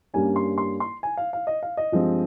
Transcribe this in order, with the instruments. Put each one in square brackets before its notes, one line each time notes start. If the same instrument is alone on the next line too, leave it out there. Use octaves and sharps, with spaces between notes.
[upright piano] G2 G3 A#3 C#4 G#5
C6
C6
C6
G#5
F5
F5
D#5
F5
D#5
G2 F3 G#3 C4